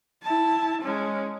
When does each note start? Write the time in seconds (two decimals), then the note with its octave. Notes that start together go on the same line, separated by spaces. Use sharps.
0.23 E4 A5
0.82 G#3 C#4